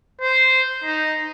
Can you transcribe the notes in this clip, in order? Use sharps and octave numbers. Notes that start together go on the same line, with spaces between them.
C5
D#4